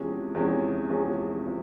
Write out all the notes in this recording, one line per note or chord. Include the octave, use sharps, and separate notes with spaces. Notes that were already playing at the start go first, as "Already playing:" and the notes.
Already playing: E2 C3 F3 G#3 C#4
E2 C3 F3 G#3 C#4
E2 C3 F3 G#3 C#4
C3 F3